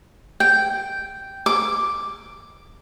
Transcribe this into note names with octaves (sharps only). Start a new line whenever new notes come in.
G5
D6